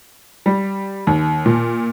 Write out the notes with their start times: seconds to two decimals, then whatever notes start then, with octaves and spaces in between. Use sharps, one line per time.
0.46 G3
1.07 D#2
1.46 A#2